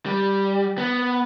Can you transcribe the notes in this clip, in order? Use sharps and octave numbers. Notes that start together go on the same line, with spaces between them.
G3
B3